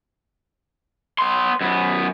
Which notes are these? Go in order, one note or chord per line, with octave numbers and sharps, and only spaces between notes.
B3 C6
F#2 B3